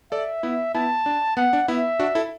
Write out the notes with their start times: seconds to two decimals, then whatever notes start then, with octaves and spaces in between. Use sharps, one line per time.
0.12 A4 D5 E5
0.43 B3 E4
0.75 B3 E4 A5
1.06 D4
1.37 B3 F#5
1.53 D4
1.68 B3 E4 E5
1.99 D4 F#4
2.15 E4 A4